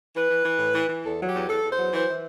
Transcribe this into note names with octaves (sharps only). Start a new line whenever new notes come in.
E3 B4
E3
E3
A2
E3
E3
E2 A4
F#3
G4
E2
E2 A4
E2
C5
F#3
E3 C5
E3